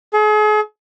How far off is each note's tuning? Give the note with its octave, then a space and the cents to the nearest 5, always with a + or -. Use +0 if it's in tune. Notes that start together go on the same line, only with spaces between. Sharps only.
G#4 +40